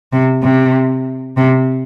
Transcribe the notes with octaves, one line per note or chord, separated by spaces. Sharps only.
C3
C3
C3